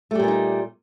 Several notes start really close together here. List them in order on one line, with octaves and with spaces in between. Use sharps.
A3 G3 A#2 B3 D#4